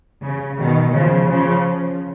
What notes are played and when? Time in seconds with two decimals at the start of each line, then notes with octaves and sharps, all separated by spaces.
0.23 C#3
0.59 B2 D#3
0.94 C#3 F3
1.29 C#3 F3